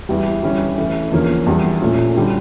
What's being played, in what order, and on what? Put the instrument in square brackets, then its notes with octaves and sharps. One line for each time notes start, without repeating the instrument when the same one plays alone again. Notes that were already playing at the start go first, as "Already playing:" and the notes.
[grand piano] E2 E3 G3
D3 G3 C#4 E4 G4
E3 A3 C#4
E2 D3 F3 A#3 C#4
E2 E3 G3 D4
A#2 A3 C#4 F4
D3 G3 C#4